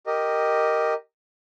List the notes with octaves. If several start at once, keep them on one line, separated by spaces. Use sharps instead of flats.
G4 A#4 D#5